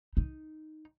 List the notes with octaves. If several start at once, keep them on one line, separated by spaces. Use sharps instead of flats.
D#4